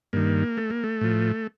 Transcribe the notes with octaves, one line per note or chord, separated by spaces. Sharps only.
G2 D#3 A#3
A3
A#3
A3
A2 F3